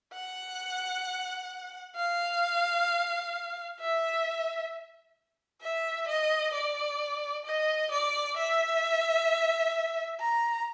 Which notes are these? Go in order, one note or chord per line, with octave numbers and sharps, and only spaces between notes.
F#5
F5
E5
E5
D#5
D5
D#5
D5
E5
A#5